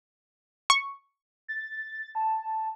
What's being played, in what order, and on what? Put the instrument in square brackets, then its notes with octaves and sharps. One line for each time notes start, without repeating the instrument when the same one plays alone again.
[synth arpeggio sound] C#6
[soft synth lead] A6
A5